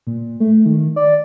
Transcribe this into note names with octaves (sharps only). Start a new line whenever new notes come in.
A#2
A3
D#3
D5